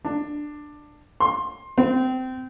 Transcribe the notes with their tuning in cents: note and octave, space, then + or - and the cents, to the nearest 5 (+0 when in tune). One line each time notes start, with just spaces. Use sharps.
D4 +10
C6 +20
C4 -25